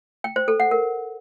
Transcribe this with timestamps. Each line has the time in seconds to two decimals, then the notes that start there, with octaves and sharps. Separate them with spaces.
0.24 G5
0.36 C5
0.48 A4
0.60 F#5
0.71 A#4